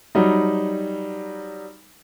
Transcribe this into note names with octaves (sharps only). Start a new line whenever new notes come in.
F#3 G3 D#4